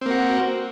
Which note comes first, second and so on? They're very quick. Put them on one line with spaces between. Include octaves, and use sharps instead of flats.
C4 A#3 F#4